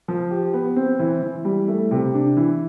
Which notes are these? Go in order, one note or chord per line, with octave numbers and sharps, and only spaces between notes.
F3
G4
B3
C4
E3
E3
G3
A3
C3
D4
E3